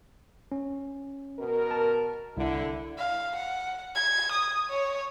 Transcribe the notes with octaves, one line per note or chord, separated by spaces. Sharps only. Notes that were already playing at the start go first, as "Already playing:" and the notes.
C#4
B2 A#4
A5
C2 D3 E4
F5
F#5
G#6
D#6
C#5